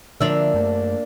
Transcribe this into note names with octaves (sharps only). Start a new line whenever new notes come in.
D3 D#3 F3 A#3 D4 E5
F#2 A3